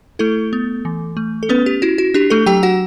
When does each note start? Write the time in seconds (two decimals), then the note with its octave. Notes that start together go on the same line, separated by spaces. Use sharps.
0.19 A3 E4 A4
0.53 B3
0.85 E3
1.17 A3
1.43 A4
1.49 B3 C#4 B4
1.66 G4
1.82 E4 F#4
1.98 F#4
2.14 D4 G4
2.30 A3 A4
2.46 F#3 G4 G5
2.63 F#4 F#5